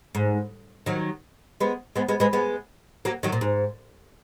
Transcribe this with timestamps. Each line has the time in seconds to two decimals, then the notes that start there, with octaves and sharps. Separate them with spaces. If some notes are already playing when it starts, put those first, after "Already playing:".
0.15 G#2
0.86 D#3 F#3
1.60 G#3 B3
1.96 G#3 B3
2.09 G#3 B3
2.20 G#3 B3
2.33 G#3 B3
3.05 F#3 A#3
3.23 D#3 F#3
3.32 A#2
3.41 G#2